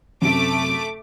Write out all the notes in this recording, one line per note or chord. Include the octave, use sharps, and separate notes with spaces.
F#2 C3 A3 D6